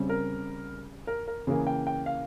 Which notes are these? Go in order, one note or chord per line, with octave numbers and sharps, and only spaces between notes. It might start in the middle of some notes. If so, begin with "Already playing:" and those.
Already playing: C#3 G3 C4
A#4
A#4
A#4
C#3 E3 A#3 G#4
G5
G5
F5